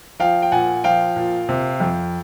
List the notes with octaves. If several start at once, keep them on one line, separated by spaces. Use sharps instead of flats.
F3 F5 G5
G5
A#2 F#5 G#5
F3 F5 G5
A#2
C3
F2